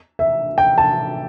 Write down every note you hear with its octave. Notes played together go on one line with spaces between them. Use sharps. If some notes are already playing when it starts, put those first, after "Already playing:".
E5
G5
A5